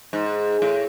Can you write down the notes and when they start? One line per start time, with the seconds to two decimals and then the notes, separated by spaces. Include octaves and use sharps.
0.13 G#2
0.62 A2